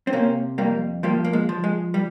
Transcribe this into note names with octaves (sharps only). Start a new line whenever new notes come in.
C4
C3 A#3 C#4
F2 G3 A#3
F3 G3 A#3
A#3
G#3
F3
G#3
G3